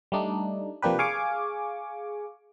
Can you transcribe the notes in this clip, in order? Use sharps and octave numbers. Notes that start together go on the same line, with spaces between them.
G3 A3 D4 D#4
C3 F3 A#3 D4 G4 B4
G#4 F5 G#5 C#6 D6